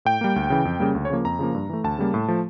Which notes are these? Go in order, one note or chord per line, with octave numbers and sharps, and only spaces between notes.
A2 G5
G3 A#3
D2
C#3 E3
F2
C#3 G3 A#3
D2
C#5
C#3 F3 A#3
F2 A#5
C#3 F3 A#3
G2
E3 A3
D2 A5
C#3 G3 A#3
A2
F3 A3